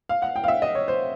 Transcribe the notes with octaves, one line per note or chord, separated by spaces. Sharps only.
F5
F#5
G5
F5
E5
D#5
C#5
C5